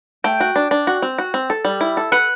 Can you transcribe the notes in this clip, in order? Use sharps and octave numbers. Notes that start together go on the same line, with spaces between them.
A3 G5
F#4
D4
D4
F#4
C4
F#4
C4
A4
G3
E4
A4
B4 F#5